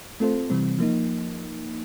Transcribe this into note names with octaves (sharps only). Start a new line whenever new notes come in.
A3 C4 F4 A4 C5
C3 E3 G3 C4
F3 A#3 D#4